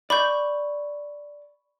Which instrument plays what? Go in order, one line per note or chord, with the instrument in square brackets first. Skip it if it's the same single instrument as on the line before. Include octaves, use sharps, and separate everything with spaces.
[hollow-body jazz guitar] D5 [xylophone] B5 C#6 G6